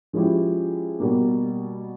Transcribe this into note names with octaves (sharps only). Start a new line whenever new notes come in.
F3 G#3 C#4 E4 G4
B2 G3 A#3